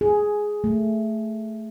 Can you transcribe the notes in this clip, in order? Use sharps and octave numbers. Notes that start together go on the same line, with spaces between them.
G#4
A3